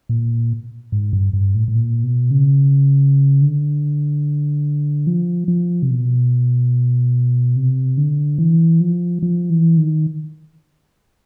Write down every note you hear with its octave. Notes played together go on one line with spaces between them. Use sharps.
A#2
G#2
G2
G2
A2
A2
A#2
B2
C#3
D3
F3
F3
C3
B2
C3
D3
E3
F3
F3
E3
D#3